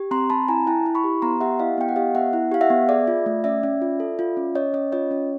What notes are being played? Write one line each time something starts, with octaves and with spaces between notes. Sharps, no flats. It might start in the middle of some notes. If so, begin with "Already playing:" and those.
Already playing: G4
C4 A#5 C6
C4 A5 B5
E4 G#5 A#5
E4 G5 A5
E4
B5 C#6
G4
B3 A#5 C6
G4 E5 F#5
E4 D#5 F5
B3 G5
F#5
G4 D#5 F5
B3 E5 F#5
E4
G4 F5
E5 F#5
B3
G#4 D5 E5
F4
A3
C#4 D5 E5
C#4
F4
A4
F4
C#4
C#4 C#5 D#5
C#4 C#5 D#5
F4 C#5 D#5
C#4 C#5